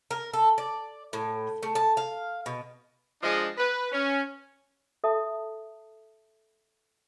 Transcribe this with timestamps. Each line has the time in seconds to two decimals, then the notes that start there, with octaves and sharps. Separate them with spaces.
0.11 A#4
0.34 A4
0.58 D5
1.13 A2
1.63 A3
1.75 A5
1.97 F5
2.46 B2
3.23 F3 G#3 D4 D#5
3.58 B4
3.92 C#4
5.04 A4 E5 A5 D#6